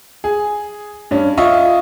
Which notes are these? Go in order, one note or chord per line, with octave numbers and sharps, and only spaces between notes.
G#4
G2 C#4
F4 D#5 E5 C#6 D#6